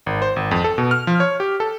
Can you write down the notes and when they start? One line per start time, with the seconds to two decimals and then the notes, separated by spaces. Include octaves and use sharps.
0.06 G#1
0.22 C5
0.36 G#1
0.51 F2
0.64 A4
0.78 B2
0.91 F6
1.07 F3
1.20 C#5
1.40 G4
1.60 A4